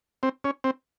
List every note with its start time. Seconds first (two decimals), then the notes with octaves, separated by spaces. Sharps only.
0.23 C4
0.44 C#4
0.64 C4